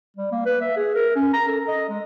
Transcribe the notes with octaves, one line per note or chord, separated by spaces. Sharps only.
G3
A#3
B4
E5
G#4
A#4
C#4
A#5
A4
D#5
G#3